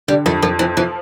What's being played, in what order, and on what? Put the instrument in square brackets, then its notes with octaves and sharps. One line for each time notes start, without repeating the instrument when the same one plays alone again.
[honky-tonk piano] D3 [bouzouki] G3
[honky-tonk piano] F2 [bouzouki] A3
[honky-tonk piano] F2 [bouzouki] F3
[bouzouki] E3 [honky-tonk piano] F3
[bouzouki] E3 [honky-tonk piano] F3